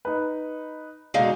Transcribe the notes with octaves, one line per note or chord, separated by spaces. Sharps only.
D#4 B4
B2 D3 G#3 D#4 F5